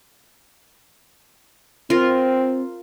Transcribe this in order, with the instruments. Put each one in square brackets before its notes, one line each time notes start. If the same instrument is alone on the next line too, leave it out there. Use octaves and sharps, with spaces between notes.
[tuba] C4 [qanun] F4 A#4